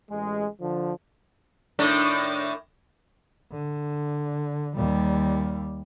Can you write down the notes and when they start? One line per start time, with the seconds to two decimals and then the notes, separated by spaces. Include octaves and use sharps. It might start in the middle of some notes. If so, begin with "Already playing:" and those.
0.10 A1 G#3
0.61 D3 F3
1.79 A2 D#3 D4
3.52 D3
4.76 D#2 G3